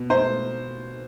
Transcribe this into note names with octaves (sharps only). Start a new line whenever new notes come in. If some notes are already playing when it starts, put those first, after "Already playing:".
Already playing: B2
C5